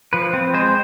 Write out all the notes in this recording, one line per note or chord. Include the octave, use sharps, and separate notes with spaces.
F3 B4
C4
G#3 C5